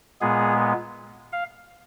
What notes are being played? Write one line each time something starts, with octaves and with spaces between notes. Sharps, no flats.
A#2 G#3 B3 G#4
F5